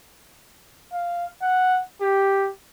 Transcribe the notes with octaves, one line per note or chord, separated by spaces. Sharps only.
F5
F#5
G4